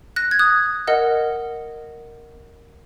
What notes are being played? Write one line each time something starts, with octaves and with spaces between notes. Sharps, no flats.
F#6 A#6
G#6
D#6 F#6
A#4 D#5 F#5